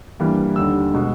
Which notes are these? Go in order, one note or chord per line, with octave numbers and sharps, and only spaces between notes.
G2 E3 G3 A#3
D#2 D3 G3 E6
B2 G#3